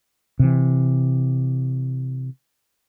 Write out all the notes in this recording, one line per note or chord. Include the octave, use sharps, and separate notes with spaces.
C3 E3